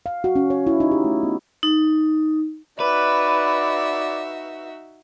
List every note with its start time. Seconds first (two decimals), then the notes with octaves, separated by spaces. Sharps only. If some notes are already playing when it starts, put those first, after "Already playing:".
0.06 F5
0.24 F#4
0.36 C#4
0.50 C#5
0.67 E4
0.80 D#4
0.91 G4
1.04 A3
1.23 B3
1.63 D#4
2.80 D#4 F#4 B4 D5 E5